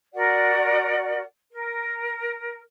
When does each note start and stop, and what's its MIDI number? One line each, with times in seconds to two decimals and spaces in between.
0.14 1.21 66
0.14 1.21 70
0.14 1.21 74
0.14 1.21 78
1.52 2.59 70